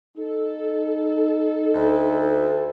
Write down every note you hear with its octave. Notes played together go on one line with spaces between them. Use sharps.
D#4 A4
D2